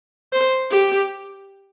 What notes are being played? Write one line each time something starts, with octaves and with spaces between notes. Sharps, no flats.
C5
G4